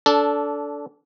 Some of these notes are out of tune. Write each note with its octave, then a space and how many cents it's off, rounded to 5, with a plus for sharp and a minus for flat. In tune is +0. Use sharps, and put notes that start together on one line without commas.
D4 -20 A4 +0